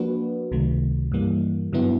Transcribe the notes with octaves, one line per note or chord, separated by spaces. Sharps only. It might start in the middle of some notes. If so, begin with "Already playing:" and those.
Already playing: F3 A#3 D4 F#4 B4
C#2 C3 D#3 F#3 A3
G2 E3 G3 A#3
G2 D3 F#3 B3 E4